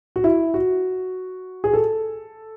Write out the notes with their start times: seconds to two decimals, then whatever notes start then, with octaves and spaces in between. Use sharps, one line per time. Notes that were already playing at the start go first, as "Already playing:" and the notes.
0.16 F#4
0.24 E4
0.54 F#4
1.64 G#4
1.73 A4